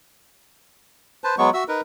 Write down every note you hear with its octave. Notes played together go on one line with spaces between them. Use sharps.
B4 C5 A5
F#3 G#3 B3 C#6
F#4 E5 E6
D#4 A#4 B4